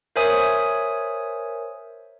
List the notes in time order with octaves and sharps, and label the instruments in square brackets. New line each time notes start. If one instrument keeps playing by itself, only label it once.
[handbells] A#4 C5 C#5 E5 G#5 D#6